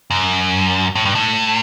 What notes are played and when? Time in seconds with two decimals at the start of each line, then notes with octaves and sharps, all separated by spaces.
0.10 F#2
0.95 A2
1.05 G2
1.15 A2